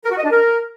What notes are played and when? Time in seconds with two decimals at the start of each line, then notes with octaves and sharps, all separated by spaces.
0.04 A#4
0.11 F#4
0.17 D#5
0.24 D4
0.31 A#4